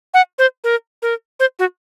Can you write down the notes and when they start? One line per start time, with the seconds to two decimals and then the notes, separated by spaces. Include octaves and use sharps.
0.14 F#5
0.39 C5
0.64 A#4
1.02 A#4
1.40 C5
1.59 F#4